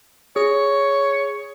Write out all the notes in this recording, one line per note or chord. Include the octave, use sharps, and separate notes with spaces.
G#4 C#5